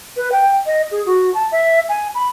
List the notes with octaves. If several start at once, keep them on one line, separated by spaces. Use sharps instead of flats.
B4
G5
D#5
G#4
F#4
A5
E5
G#5
B5